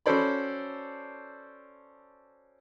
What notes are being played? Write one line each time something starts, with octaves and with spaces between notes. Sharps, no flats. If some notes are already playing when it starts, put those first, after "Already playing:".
C#4 F#4 A4 C5 D5 B5